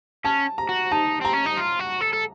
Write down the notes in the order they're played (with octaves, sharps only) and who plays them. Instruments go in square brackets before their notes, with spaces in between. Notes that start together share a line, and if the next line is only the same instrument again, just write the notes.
[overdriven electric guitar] C#4 [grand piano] A5
[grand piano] A#5
[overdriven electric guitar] F#4
[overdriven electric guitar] D#4 [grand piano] A5
[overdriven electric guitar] C4 [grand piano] A#5
[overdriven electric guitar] C#4
D#4
F4
F#4
A4
A4